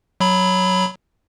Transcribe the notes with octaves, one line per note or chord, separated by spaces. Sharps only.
F#3 B5